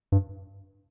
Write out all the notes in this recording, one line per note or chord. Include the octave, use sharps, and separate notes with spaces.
G2